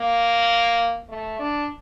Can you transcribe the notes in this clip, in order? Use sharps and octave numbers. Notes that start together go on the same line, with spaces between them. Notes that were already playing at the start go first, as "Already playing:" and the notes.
Already playing: A#3
A3
D4